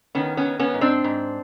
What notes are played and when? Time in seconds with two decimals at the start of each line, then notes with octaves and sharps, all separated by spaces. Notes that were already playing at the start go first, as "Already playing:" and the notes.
0.15 D#3 B3 C#4
0.37 B3 C#4
0.45 D#3
0.59 B3 C#4
0.74 G#2
0.81 C4 D4
1.04 G#2